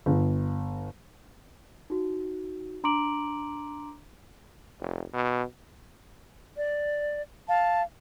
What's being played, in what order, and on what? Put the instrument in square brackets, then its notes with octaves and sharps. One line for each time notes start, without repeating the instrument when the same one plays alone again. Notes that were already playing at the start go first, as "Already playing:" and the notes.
[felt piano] G1
[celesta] D#4 F#4
D4 A#5 C6 D6 D7 F#7
[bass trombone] F1
B2
[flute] D5
[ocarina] F5 [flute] A5